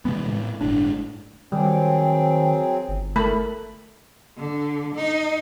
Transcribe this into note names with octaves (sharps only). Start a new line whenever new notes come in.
C3 E3 G#3 B3
A2 B3
G1 A2 G#3 D4
D#3 F#3 G3 C4 G#4 G5
G1
A3 A#4 A5 B5
D3
D#4